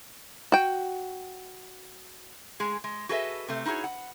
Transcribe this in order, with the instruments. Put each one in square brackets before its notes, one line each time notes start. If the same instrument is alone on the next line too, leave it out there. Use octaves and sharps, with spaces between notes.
[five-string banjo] F#4 G5
[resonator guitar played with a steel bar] A2 G#3 G#4
G#3
F#4 G#4 A4 B4 D#5 E5
C3 A3
D#4 E4 F#4 G#4 C#5
F#5